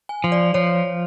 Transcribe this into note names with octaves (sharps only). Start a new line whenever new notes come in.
G#5
F3
D5
F3 C#5